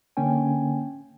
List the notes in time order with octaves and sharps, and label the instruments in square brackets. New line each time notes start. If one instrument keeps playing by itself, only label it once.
[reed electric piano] D3 A#3 C#4 G5 G#5